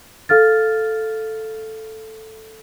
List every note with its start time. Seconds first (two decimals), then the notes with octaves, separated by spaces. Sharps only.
0.29 A4 F5 F6 A6